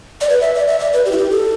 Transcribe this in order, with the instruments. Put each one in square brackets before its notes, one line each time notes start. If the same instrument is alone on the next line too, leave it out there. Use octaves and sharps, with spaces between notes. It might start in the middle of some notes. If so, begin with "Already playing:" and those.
[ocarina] D5
B4
E5
D5
E5
D5
B4
G4
E4
G4
A4